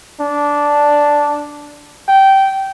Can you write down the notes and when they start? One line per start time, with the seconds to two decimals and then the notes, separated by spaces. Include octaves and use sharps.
0.20 D4
2.08 G5